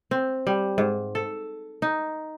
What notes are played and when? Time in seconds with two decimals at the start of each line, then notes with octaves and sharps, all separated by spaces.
0.11 C4
0.47 G3
0.78 G#2
1.15 A4
1.82 D#4